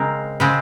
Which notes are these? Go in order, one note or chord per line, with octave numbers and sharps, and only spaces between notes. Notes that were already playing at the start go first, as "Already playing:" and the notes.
Already playing: C#3 G#3 C4 A#4
C#3 G#3 C4